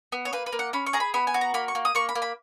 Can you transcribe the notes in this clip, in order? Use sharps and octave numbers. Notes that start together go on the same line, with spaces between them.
B3
C#5
A#3 B4
B4
A#3
F#5
C#4 B5
C#6
G#4 A#5
B5
B3 B5
G#5
F#4
A#5
A#3 B5
C#6
A#3
D#6
A#3 C#6
B5
A#3
B5